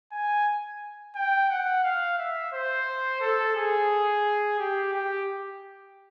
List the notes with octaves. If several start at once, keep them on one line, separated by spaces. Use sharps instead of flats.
G#5
G5
F#5
F5
E5
C5
A4
G#4
G4
G4